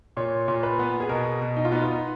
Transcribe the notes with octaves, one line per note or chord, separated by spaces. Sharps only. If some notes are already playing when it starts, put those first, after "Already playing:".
A#2 C#5
A#2
B4
B3
G#4
B2 A#4
B2
D#4
F4
B3 D#4
F4
D#4